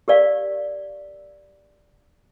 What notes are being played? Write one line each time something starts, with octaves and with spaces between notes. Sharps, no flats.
G4 A#4 D5 F5